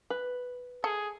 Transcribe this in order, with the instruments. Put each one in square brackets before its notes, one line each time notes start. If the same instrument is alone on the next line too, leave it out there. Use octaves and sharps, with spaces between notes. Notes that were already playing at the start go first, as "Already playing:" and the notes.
[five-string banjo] B4
[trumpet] G#4 [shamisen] A4